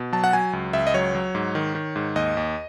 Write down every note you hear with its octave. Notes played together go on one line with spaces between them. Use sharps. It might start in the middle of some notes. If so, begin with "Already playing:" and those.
Already playing: B2
F#3 A5
F#5
F#3 G#5
C#2
C#2 E5
D#5
F#3 C#5
F#3
G#2
D#3
D#3
G#2
D#2 D#5
D#2